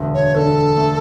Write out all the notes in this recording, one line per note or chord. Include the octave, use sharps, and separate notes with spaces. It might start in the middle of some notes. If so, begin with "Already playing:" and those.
Already playing: E1 D2
C#5
D3 A4
A3